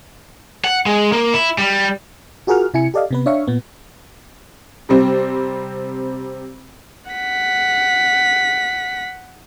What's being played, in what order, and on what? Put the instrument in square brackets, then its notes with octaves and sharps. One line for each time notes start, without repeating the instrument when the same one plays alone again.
[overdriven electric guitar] F#5
G#3
A#3
E4
G3
[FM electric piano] F4 F#4 G#4 A#4 F#5 F6
C3 E4 G#5 C#7
G4 A4 D5 D#5 F5
C3 B3 B4
D4 C#5 E5 F5 C#6
A#2 B3
[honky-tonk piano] C3 G3 C4
[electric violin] F#5 B6